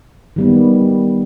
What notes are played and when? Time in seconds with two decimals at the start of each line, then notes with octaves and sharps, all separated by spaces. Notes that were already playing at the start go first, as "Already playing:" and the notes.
0.36 D#3 G3 B3